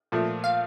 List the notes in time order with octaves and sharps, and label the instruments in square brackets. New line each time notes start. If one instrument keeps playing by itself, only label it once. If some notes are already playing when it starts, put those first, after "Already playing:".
[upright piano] A#2 F3 A3
[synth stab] F5